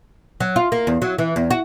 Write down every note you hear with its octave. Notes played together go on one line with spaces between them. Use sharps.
F#3
F4
A#3
E2
F#3
E3
E2
F#4